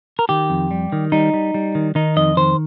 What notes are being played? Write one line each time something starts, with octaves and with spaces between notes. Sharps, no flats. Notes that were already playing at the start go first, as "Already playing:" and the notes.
A#4
D#3 G4
F2
G3
D#3
G3 D#4
G3
G3
D#3
D#3 D#4
F2 D#5
D#3 C5